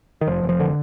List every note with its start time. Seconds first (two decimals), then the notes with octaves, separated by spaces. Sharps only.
0.21 D#3
0.27 F1 F3
0.43 F1
0.49 F3
0.60 D3